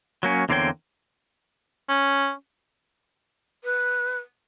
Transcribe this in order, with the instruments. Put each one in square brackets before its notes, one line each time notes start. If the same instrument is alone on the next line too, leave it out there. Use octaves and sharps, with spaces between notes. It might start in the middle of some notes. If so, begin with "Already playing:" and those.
[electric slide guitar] F#3 A#3 C#4
E2 D3 A#3 C4 C#5 G5
[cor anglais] C#4
[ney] B4